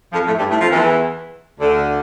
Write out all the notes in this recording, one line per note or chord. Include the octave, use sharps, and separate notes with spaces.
F2 F3
A2 A3
G2 G3
A2 A3
F2 F3
E2 E3
D2 D3